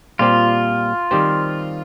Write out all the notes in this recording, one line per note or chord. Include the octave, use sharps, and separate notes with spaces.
A#2 G3 C4 F4 G4 C5
D#3 G3 C4 G4 C5